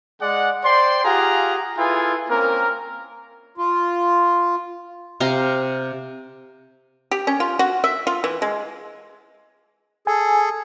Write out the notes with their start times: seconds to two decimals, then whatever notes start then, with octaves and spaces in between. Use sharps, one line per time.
0.22 G#3 D5 F#5
0.64 C5 D5 G5 C6
1.04 F4 G4 G#4 F5 F#5 A#5
1.78 E4 F4 G#4 A4 B4 G#5
2.30 A#3 C4 C#4 A#4
3.58 F4
5.20 C3 F5 A#5 C6
7.11 G4
7.27 C#4
7.40 F4
7.59 F#4
7.84 E5
8.07 F4
8.24 E3
8.42 G#3
10.07 G#4 A4 G#5